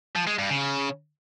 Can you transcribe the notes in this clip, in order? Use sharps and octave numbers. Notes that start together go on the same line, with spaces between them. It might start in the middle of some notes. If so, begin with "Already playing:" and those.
F3
G#3
G2
C#3